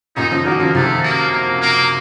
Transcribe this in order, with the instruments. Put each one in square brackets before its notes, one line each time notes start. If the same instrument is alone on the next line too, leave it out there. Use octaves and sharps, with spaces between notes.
[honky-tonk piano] F#2 A#2 [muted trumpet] D#4
[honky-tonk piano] C#3 F3
[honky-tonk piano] D#3 F#3 [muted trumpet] A#3
[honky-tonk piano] C#3 F3
[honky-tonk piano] C3 D#3 [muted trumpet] A3
[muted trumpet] A#3
A#3
A#3